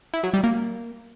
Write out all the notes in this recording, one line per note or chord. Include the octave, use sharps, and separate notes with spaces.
E4
F#3
G3
A#3